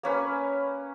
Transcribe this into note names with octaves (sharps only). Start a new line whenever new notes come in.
A#3 C#4 B4